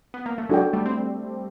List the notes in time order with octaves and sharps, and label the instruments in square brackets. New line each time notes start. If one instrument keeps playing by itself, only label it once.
[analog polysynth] B3
A#3
A3
[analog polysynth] F#3 G#3 [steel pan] D4 F#4 A4 D5 G5
[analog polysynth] G3 A3
C4